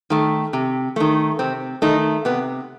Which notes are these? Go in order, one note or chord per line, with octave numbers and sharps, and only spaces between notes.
D#3 A3
C3
D#3 A3
C3 C4
D#3 A3 D#4
C3 B3